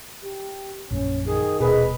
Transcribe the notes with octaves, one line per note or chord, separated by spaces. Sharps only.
G4
A#1 F#2 A#2 C#4
D#3 G#4
D#1 B2 G#4 B4 D#5